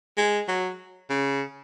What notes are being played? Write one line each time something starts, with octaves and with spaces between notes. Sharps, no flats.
G#3
F#3
C#3